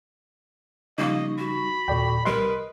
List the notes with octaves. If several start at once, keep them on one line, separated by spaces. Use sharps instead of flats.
C#3 F3 G3 A#3 D#4 D#5 C#6
F#4 B5
D#2 A#2 A4 D5 G5
C2 G3 A#4 B4 D#5 C6